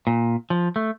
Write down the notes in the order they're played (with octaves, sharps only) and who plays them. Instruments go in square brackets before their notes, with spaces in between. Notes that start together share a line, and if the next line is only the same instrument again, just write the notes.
[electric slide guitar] A#2
F3
A3